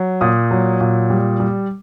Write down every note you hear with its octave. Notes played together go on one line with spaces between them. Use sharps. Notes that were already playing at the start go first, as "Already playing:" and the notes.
Already playing: F#3
A#2 D#6
F#3
A#2
G3
G3